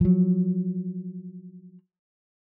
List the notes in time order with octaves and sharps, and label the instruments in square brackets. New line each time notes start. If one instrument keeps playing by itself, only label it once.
[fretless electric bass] F3 F#3